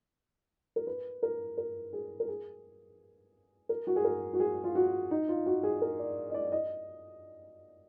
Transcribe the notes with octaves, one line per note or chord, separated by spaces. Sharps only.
A#4
B4
A#4
A#4
G#4
A#4
G#4
A#4
F#4
G#4
A#4
F#4
G#4
F4
F#4
D#4
F4
F#4
G#4
A#4
D5
D#5
D5
D#5